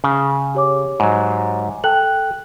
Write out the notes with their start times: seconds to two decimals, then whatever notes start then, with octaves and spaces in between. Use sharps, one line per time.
0.04 C#3
0.55 G4 C#5 D6
1.00 G#2 F#3
1.84 A4 G5 F#6 F#7